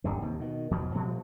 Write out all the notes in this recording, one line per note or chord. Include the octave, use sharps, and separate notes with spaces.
D1 A#1 G2 D3
D#2 C3
B2 D#3
E2 B2 F3 F#3
A#2 F3 G3 A3